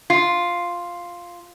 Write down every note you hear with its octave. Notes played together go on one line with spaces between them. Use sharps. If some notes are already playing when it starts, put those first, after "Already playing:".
F4